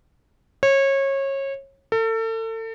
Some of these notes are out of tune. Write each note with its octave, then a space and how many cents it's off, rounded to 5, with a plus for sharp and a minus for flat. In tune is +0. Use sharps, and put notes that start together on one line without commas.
C#5 -25
A4 +35